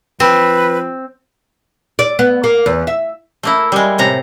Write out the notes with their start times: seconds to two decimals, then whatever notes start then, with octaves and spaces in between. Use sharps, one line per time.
0.20 F3 C4 B4
1.99 D5
2.19 B3
2.44 A#3
2.66 E2
2.87 E5
3.43 A3 A#3 E4
3.72 G3 G#3
3.98 A2 C3 A#5